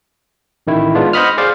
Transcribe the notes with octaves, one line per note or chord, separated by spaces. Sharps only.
A1 D#3 E4
G#3 B3 D4 F4
C5 D#5 F#5 B5 D#6 F6
G#4 C5 D5 F5